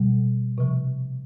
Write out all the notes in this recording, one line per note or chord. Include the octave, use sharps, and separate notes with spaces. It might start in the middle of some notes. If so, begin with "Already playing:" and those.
Already playing: B2 G3
C3 F3